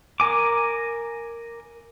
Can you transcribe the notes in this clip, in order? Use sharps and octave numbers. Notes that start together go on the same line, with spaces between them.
A#4 G#5 D6